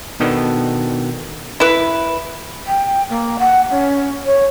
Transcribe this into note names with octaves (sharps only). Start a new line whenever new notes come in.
B2 D#3 B3 D4 A4
E4 B4
G5
A#3
F#5
C#4
C#5